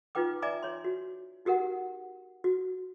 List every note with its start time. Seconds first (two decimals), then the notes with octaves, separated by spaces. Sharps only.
0.15 D#4 F4 B4 G5 D6
0.42 D5 E5 G#5 A#5 D6
0.63 C#5 C6
0.84 F#4
1.45 D#4 F#4 G4 A#4 F#5
2.44 F#4